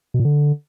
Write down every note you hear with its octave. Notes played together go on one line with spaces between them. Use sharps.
B2
A#2
D3